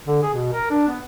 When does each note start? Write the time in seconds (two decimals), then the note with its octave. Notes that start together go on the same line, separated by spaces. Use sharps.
0.07 D3
0.23 G#4
0.34 B2
0.52 A#4
0.70 D4
0.88 B3